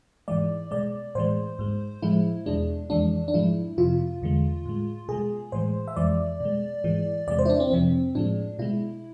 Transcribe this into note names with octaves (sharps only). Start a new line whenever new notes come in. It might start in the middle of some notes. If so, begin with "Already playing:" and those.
G#2 E3 G#3 D5
B2 G#3 D5
A2 E3 G#3 C5
G#2 G#3
A2 F3 G#3 E4
E2 B2 G#3 D4
F2 E3 G#3 D4
D4
G#2 F3 G#3 E4
F2 C3 F3 F4
E2 D3 G#3
A2 G#3
B2 G#3 G#4
A2 E3 G#3 C5
E5
F2 E3 G#3 D5
B2 G#3
G#2 E3 G#3
E2 C3 G#3 D5
C5
E4
D4
C4
F2 C3 F3 C4
A2 F3 G#3 D4
B2 G#3 E4